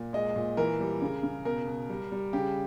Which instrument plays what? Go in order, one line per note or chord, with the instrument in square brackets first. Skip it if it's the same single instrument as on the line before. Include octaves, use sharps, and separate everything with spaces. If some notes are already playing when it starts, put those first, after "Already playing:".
Already playing: [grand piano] A#2
G#3 D#5
A#2
E3 A#4
G3
C#3
C#3
B2 A#4
B2
G3
G3
C#3 G4